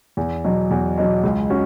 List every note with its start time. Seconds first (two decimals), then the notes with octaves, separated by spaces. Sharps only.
0.17 E2
0.44 B2 F#3
0.71 E2
0.98 B2 F#3
1.23 C#2
1.50 C#4 F#4